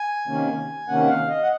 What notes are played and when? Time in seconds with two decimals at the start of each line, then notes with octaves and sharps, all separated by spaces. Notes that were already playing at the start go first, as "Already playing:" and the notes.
Already playing: G#5
0.28 C3 D#3 A#3 C#4
0.88 C3 D#3 A#3 C#4 F#5
1.07 F5
1.28 D#5
1.43 F#5